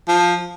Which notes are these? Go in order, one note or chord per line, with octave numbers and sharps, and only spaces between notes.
F3